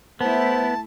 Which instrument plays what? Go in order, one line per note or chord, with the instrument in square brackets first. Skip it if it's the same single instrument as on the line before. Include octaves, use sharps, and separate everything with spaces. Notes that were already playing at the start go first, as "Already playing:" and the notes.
[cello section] A3 E4 [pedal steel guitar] B3 [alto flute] C5 [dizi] A5